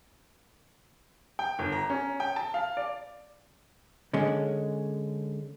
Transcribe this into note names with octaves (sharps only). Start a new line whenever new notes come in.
G5
G1
A#5
C#4
G5
A5
F5
D5
D3 G#3 C#4